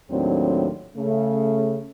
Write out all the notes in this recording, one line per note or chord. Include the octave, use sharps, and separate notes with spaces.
D#2 A2 F#3 C4 D4
C#3 A3